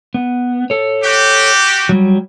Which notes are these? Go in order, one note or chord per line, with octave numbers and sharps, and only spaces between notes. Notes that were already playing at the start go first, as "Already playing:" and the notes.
B3
A4 C#5
F#4 G4
F#3 G3